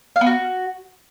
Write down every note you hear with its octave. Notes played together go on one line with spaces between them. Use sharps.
F5
B3
F#4